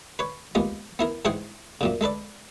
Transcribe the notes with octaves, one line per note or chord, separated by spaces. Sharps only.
B4 C#5
D#2 G#3 B3 F4
B3 E4 A#4
G#2 E3 G#4 C5 F#5 G5
F#2 A#2 C#3
G#3 A4 B4 D5